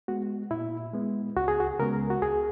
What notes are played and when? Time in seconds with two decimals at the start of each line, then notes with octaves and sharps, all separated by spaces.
0.08 G#3 B3 F#4
0.51 A#2 E4
0.93 G#3 B3
1.36 C#2 F#4
1.48 G#4
1.60 F#4
1.79 C#3 G#3 B3 A#4
2.10 F#4
2.22 C#2 G#4